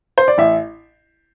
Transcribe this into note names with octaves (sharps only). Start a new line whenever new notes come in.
C5
D5
A1 E5